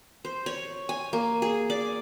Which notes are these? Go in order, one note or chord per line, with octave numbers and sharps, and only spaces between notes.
C5
C#5
G#5
A#3
G#4
D5